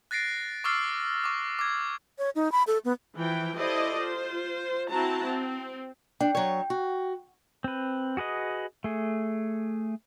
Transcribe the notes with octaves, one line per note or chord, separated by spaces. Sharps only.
F#6 A6 A#6 C7 D7
C#6 D6 E6 F6 A6 C7
C#6 D6
D6 G#6
C#5
D#4
B5
A4
B3
E3 F3 G5
E4 G4 A4 C5 D5 D#5
F4 C5
C4 E4 F#4 A5 A#5
C4
D4 G5
F#3 C#5
F#4
C4 B4
F#4 G#4 B4 D#5
A3 G#4